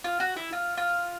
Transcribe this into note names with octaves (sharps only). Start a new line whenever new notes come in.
F4
F#4
E4
F4
F4